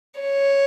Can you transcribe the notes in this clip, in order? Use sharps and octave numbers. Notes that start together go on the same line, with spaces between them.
C#5